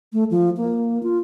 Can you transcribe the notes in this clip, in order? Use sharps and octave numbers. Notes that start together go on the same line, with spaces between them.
A3
F3
A#3
F4